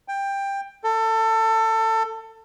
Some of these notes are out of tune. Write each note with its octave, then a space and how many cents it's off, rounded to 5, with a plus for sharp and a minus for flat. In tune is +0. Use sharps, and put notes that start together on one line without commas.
G5 +15
A4 +25